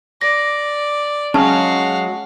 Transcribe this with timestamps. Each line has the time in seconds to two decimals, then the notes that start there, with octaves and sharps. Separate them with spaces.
0.21 D5 A#6
1.34 F#3 G#3 C#4 F#4 F5 A5